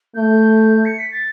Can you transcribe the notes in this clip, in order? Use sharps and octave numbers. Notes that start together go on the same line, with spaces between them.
A3 G6
C#7
B6
A6